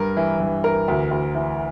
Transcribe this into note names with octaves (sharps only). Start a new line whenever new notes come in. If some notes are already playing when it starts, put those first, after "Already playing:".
Already playing: G2 A#4
E3
G2
E3 A#4
D2
D2
E3